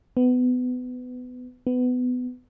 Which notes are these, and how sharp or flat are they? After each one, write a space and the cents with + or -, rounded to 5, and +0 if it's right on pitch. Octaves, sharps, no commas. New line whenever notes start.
B3 +20
B3 +20